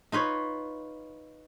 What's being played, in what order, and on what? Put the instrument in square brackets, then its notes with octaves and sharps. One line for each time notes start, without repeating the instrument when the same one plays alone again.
[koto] D#4 F4 B4 C#5